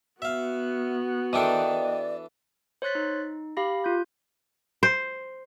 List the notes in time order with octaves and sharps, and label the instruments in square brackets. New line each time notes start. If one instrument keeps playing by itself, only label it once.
[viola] B3 F#4 [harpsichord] E5 F5
[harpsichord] E3 D4 A4 [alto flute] D5 [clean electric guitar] D#5 G5
[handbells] C5 C#5 C6 F#6 A6 B6
D#4
G4 F5 B5 A#6
F4 G6
[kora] C5